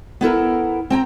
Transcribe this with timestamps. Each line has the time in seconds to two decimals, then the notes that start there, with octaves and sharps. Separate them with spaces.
0.21 B3 E4 A4 A#4
0.90 C4 G5 G#5 A#5